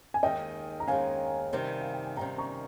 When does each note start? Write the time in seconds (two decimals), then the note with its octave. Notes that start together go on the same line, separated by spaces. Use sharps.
0.14 G#5
0.23 D#2 D#3 G#3 D#5 G5
0.80 A#5
0.88 D#2 D#3 G#3 F5 G#5
1.53 C3 D#3 G3
1.81 F5
1.93 G5
2.05 G#5
2.16 C3 D#3 G3 G5 A#5
2.38 A#5 C#6